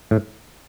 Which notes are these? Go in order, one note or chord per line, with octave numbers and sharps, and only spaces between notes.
A2